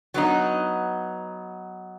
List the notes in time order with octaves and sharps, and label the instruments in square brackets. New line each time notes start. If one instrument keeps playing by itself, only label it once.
[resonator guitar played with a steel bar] F#3 B3 D#4